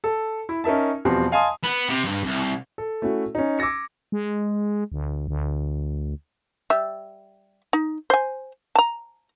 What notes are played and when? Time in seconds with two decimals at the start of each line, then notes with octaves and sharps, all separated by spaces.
0.04 A4
0.49 E4
0.64 C#4 D#4 A#4 E5 A5
1.05 E2 B2 F3 G3 C4
1.31 D#5 F5 G#5 A5 C6 D#6
1.63 B3
1.89 C3
2.05 G2
2.24 C2
2.78 A4
3.02 A3 C#4 E4 F#4
3.35 C#4 D#4
3.59 D6 E6 G#6 A#6 C#7
4.12 G#3
4.92 D2
5.28 D2
6.70 G3 E5
7.73 D#4
8.10 C5 G#5
8.75 A5 A#5